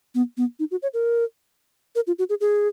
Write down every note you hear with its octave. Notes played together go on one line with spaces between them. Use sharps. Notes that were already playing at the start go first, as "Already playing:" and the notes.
B3
B3
D#4
F#4
C#5
A#4
A#4
F4
F#4
G#4
G#4